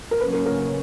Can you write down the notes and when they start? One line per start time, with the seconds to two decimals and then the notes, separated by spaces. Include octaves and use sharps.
0.11 A#4
0.20 C#3 F#3 A#3 C#4 B4
0.33 A#4
0.46 A#4